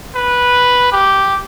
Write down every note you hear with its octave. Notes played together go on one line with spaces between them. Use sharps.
B4
G4